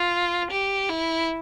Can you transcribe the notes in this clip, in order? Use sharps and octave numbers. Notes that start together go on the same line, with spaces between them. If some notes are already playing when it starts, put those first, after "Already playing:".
Already playing: F4
G4
E4